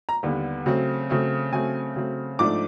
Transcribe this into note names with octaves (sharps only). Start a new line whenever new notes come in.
A#5
D#2 D3 G3 B3
C#3 F#3 A3 C4
C#3 F#3 A3 C4
C#3 F#3 A3 C4 G#5
C#3 F#3 A3 C4
G#2 F3 A3 D4 D6